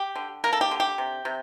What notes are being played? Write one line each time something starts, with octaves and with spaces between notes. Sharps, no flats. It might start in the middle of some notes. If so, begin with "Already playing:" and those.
Already playing: G4
D3
A#3 A#4
A4
G4
D3
G4
C3
C3